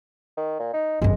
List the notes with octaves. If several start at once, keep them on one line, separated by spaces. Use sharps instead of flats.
D#3
A#2
D#4
G1 F#2 G#3